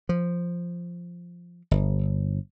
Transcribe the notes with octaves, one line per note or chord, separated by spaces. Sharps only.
F3
G1